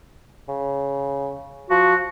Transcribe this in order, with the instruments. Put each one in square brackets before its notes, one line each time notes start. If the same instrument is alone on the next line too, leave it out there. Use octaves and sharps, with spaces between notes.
[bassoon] C#3
[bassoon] F3 [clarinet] F#4